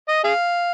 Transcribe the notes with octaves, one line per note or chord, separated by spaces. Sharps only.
D#5
G#4 F5